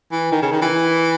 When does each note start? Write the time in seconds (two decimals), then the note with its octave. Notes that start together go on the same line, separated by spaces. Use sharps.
0.12 E3
0.32 D#3
0.42 C#3
0.52 D#3
0.62 E3